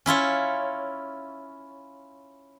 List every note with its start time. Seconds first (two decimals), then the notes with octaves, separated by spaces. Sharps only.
0.06 C#4 E4 F4 C#5